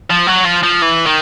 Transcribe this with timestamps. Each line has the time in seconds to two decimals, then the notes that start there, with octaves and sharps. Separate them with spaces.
0.11 F3
0.27 F#3
0.45 F3
0.63 F3
0.82 E3
1.06 D#3